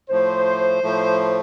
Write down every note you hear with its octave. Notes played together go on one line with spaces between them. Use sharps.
A2 F3 A3 C5
A2 F3 A3